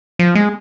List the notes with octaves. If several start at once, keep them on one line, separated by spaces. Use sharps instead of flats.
F3
G#3